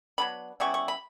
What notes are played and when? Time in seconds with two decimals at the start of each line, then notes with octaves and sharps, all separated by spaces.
0.18 F#3 B3 D4 B5
0.60 C#3 G3 B3 E4 C#6
0.74 C#6
0.88 B5